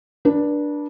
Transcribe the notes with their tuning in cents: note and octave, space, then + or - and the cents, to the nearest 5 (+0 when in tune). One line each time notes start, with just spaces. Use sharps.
D4 +0 B4 -40